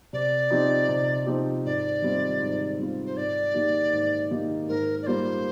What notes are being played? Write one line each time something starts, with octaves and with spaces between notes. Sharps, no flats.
C3 D5
F3 C4 D#4 G4
C3
F3 C4 D#4 G4
G#2 D5
D#3 G3 C4 F4
G#2
D#3 G3 C4 F4
C5
G#2 D5
D#3 A#3 D#4 G4
G#2
D#3 A#3 D#4 G4
G#2 A#4
D5
G3 A#3 F4 C5